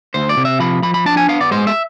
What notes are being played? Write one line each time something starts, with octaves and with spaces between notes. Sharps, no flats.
D2 C5
D5
C3
E5
F3 B5
F3 B5
B5
D4 A5
G#5
B3 F5
D5
G#3 C5
E5